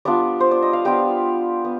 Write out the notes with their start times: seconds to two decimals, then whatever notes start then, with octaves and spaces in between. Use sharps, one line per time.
0.05 G3 B3 D4 F4 D5
0.40 C5
0.51 D5
0.62 D#5
0.73 F5
0.85 G3 B3 D4 F4 G5
1.65 B3